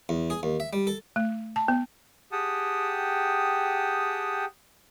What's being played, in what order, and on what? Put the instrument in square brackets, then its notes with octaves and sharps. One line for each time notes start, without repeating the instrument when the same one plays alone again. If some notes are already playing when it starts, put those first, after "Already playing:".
[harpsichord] E2
G#4
D#2
E5
G3
A4
[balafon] A3
A5
B3
[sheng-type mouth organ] G4 G#4 F#5 G5 A5 D#6